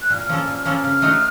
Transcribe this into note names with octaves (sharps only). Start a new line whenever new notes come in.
F#6
A#2 F6
F3 A#3 C#4 A4
A#2
F3 A#3 C#4 A4
C#3 F6
A3 D#4 F#4